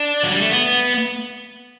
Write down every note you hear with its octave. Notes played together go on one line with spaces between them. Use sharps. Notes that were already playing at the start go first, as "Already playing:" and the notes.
Already playing: D4
F#3
G3
A3
B3